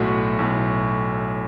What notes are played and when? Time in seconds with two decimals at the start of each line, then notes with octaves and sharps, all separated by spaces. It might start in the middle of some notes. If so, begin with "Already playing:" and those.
Already playing: B1 A2 A3 F#4
0.39 B1 A2 A3